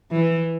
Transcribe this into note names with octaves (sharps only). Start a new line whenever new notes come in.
E3